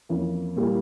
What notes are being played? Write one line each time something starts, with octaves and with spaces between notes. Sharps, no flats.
F2 E3 A#3 C#4
A#2 G3 A#3 E4